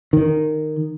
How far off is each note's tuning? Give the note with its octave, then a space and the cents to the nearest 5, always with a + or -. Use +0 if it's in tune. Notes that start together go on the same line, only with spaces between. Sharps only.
D#3 -15